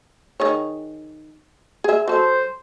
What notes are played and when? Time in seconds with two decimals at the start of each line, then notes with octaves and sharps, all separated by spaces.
0.40 D#3 G#4 C#5
1.84 G#4 E5
2.08 F#3 A4 C5